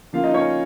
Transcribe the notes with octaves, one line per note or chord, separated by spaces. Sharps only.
C#3 F3 A#3 F4 F5
D#4 D#5
C#4 C#5